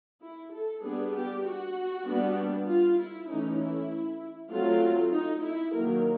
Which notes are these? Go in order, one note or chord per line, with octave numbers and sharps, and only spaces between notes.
E4
A4
G3 B3 D4 G#4
G4
F#4
G3 B3 D4
F4
E4
E3 A3 C#4 D#4
E4
F#3 A3 C4 F4
D#4
E4
D#3 F#3 A#3 A#4